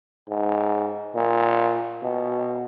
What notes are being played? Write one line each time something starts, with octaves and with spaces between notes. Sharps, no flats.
G#2
A#2
B2